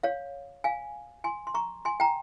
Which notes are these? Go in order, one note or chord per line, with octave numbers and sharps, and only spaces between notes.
C#5 F5
F5 G#5
G#5 C6
C6
A#5 C#6
G#5 C6
G5 A#5